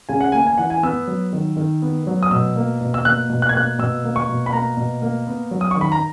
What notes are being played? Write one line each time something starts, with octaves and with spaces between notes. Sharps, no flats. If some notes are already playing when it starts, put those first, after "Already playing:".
C#3 G#5
F#5
A#3 G#5
G#5
E3 F#5
G#5
B3 E6
F#3
D#3
D#3
B3
F#3
D#6
B2 E6
A#3
B2
E6
A#3 F#6
B2
F#6
G#6
A#3 F#6
B2 E6
A#3
C#6
B2
B5
A#3 A#5
B2
A#3
B3
F#3
D#6
C#6
D#3
B5
A#5